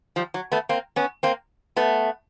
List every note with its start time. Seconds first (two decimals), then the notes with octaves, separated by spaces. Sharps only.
0.16 F3 G3
0.34 F#3
0.52 A3 B3
0.69 A#3 C4
0.96 B3 C#4
1.23 A#3 C4
1.76 A3 B3